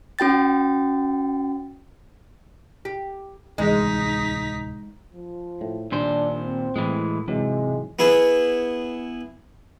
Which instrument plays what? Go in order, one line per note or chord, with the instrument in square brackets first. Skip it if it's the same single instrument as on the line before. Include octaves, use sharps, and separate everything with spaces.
[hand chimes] C#4 F#4 G5 A6
[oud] G4
[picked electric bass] D1 C2 E3 [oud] G#3 [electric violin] D#4 B6
[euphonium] F3
[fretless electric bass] A2
[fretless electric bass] D#1 D#2 [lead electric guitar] A#2 C5 [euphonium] D4
[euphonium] C4
[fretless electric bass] A2 [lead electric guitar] E3 G#3
[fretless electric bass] G#2 E3 F#3 [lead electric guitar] C3 [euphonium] G#3
[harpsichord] B3 E4 G#4